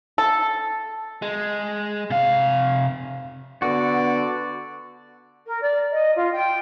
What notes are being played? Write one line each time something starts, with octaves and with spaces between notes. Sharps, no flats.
A4
G#3
C3 F5
D3 B3 F#4 D5
A#4
D5
D#5
F4
G5